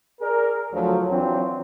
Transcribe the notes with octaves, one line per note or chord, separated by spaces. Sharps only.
G#4 A#4 D5
D2 F3 F#3
E3 F#3 C4 D4 F4